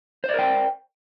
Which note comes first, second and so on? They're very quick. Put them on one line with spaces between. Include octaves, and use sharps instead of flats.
C5 D5 A#4 G5